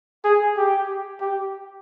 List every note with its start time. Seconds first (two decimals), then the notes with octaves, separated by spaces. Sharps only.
0.25 G#4
0.57 G4
1.21 G4